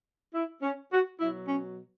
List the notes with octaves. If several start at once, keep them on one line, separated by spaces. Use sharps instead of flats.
E4
C#4
F#4
B2 F#3 E4
C#4